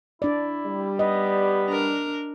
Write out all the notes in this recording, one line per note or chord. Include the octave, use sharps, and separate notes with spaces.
D4 E4 D5
G3
B3 D#5
D4 A#4